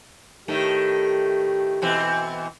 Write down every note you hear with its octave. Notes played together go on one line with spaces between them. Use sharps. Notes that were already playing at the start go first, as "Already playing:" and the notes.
A2 D#3 A3 G4
B2 E3 C4